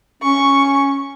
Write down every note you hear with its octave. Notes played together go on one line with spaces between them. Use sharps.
C#4 C#6